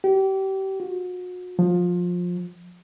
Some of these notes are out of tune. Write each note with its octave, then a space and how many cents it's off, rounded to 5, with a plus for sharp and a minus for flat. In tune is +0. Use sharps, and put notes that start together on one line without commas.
G4 -30
F#4 -40
F3 +20